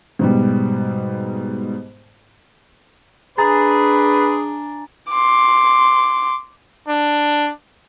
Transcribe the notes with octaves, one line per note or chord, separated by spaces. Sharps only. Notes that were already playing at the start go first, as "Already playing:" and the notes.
G#2 B2 G3
D4 G#4 B4 G#5 A#5 A6
C6 D6
D4